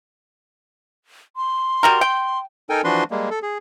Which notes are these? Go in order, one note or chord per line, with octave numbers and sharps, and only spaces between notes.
C6
G3 F#4 A#4
G5
D#4 A4 A#4 G5 G#5
E3 F3 D4 F#4 B4 C6
G3 G#3 A#3
A4
G#4